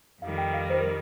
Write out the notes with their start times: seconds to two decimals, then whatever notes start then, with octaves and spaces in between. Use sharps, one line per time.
0.22 F2 D#3 G3 F5
0.38 G5
0.54 F5
0.70 C5
0.79 A#4